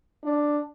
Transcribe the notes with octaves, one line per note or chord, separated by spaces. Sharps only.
D4